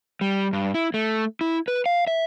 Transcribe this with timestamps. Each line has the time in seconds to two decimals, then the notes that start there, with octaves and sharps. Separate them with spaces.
0.21 G3
0.53 G2
0.74 E4
0.94 A3
1.41 E4
1.68 B4
1.86 F5
2.07 E5